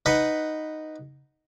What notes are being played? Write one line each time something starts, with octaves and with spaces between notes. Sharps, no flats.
D#4 B4 D#5 F#5